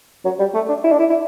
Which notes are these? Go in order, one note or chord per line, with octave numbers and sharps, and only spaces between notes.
F#3
G3
A3
D4
E4
D4
E4
E4